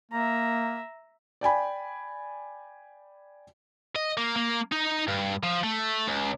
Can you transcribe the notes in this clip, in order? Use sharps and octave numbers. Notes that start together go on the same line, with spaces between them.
A#3 E5 A#5
D5 G5 G#5 B5
D#5
A#3
A#3
D#4
G2
F3
A3
C#2